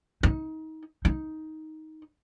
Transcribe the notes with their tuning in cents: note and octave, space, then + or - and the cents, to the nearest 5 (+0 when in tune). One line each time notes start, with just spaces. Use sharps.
D#4 +25
D#4 +10